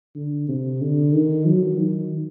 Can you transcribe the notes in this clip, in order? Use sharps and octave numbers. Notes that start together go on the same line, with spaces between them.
D3
C3
D3
D#3
F#3
D#3